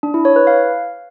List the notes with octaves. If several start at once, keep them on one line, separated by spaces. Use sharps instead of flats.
D4
E4
C#5
B4
F5